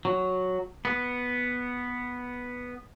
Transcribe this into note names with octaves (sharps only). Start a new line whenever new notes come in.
F#3
B3